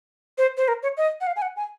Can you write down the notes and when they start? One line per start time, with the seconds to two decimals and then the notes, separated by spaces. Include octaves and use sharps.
0.38 C5
0.57 C5
0.68 A#4
0.83 C#5
0.97 D#5
1.21 F#5
1.27 F5
1.36 G#5
1.42 F#5
1.56 G#5